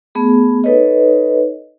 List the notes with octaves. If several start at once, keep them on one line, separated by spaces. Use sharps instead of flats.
A3 B3 G#4
D#4 A4 B4 C#5 D#5